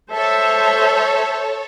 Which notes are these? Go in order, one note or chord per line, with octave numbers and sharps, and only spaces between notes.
A4 C5 C#5 E5